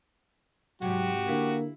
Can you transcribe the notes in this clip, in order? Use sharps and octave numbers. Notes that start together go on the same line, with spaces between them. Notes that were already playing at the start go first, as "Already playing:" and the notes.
G#2 C3 F#3 F#4 G4
D3 A#3 E4 F5